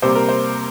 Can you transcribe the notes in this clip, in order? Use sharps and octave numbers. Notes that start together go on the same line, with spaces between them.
C3 G3 A#3 C5
A#4
C5